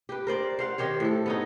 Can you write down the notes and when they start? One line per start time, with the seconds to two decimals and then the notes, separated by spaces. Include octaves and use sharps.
0.09 G4 B4
0.27 A#4 C5 D5
0.59 C5 F5 F#5
0.78 D#3 G4 C5 C#5
1.00 A2 A4
1.26 B3 C#4 D#4